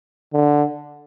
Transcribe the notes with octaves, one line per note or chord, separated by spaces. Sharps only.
D3